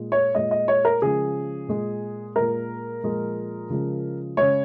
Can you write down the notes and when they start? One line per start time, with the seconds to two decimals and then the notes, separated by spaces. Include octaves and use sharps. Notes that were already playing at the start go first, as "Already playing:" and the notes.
Already playing: A#2 G#3
0.12 C#5
0.35 A#2 G#3 D#5
0.51 D#5
0.68 C#5
0.85 A#4
1.02 C#3 F3 G#3 G#4
1.68 A#2 G#3
2.36 A#2 G#3 A#4
3.03 A#2 F3 G#3
3.70 C#3 F3 G#3
4.37 C#3 G#3 C#5